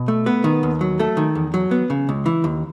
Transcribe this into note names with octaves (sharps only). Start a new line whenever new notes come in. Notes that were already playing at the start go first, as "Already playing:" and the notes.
Already playing: B2
A3
B3 B4
D#3
D#2
F#3
A3 A4
D#3
E2
F#3
B3
C#3
C#2
E3
D#2